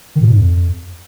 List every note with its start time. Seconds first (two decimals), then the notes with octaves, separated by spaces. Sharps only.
0.16 D#3
0.21 A2
0.26 A#2
0.32 G#2
0.37 F2